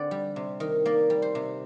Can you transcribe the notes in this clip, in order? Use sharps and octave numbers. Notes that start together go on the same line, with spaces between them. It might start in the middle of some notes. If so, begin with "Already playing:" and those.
Already playing: D3 C4 D5
G3
C3
D#3
A#3 D5
G3
C5
C3